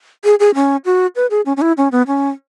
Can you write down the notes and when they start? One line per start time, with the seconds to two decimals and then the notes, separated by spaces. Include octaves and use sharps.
0.24 G#4
0.40 G#4
0.55 C#4
0.85 F#4
1.16 B4
1.31 G#4
1.46 C#4
1.57 C#4
1.62 E4
1.77 C#4
1.92 B3
2.07 C#4